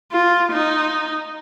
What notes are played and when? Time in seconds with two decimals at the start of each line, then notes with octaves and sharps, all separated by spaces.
0.12 F4
0.52 D#4